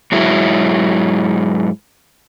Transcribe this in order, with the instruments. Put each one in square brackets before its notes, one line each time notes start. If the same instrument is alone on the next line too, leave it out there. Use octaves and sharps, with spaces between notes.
[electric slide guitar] G#2 F#3 E4